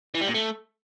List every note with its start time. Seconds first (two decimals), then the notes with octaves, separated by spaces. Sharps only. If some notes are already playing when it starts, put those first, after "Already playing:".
0.15 E3
0.21 G3
0.28 A#2
0.35 A3